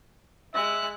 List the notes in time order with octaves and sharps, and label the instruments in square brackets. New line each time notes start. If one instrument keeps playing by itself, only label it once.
[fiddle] G#3 F#6 [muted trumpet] E5